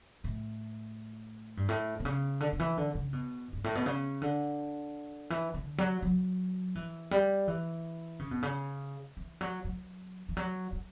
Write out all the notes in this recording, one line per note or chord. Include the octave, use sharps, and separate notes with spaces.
A2
G2
A2
B2
C#3
D3
D3
E3
D3
C#3
B2
G2
A2
B2
C#3
D3
E3
D3
F#3
F#3
E3
G3
E3
C#3
B2
C#3
E3
F#3
F#3
E3
F#3
F#3